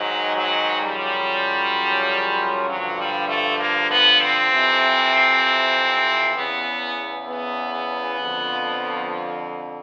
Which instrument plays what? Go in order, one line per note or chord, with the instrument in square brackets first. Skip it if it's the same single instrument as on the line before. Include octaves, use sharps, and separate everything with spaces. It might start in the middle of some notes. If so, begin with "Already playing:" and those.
Already playing: [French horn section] G#2 D#3 F#3
F#3
F#2 C#3 F3 G3
G2 D3 F3 F#3
G3
A3
A#3
B3
C4
F2 C3 E3
E2 C#3 E3 B3
B3
F2 D3 F3